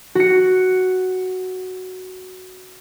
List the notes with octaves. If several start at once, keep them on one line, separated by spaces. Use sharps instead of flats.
F#4 C#7